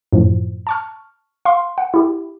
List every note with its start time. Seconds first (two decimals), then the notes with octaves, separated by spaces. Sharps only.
0.13 F#2 A2 F3
0.67 A5 C#6 F6
1.45 F5 C6
1.78 F#5
1.94 E4 G4